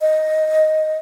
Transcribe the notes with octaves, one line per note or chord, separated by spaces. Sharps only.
D#5